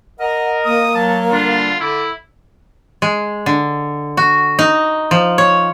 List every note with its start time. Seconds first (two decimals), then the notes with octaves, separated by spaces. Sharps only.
0.20 A#4 D#5 F#5
0.65 A#3 D#6
0.95 F#3 A5
1.31 D3 G3 D4 F4
1.80 D3 E4 D6
3.02 G#3
3.46 D3
4.17 F#4
4.59 D#4
5.11 F3
5.38 C#5